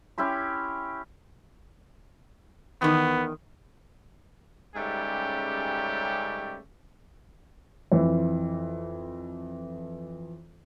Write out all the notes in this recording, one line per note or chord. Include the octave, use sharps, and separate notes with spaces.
C#4 E4 G4 C6
E2 D#3 B3
G#2 C#3 G3 A3 C#4 G4
F2 E3